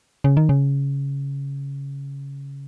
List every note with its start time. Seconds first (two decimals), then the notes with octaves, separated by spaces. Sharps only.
0.24 C#3
0.37 D#3
0.49 C#3